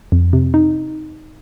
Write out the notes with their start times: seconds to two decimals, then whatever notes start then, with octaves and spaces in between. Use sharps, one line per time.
0.12 F2
0.33 C3
0.54 D#4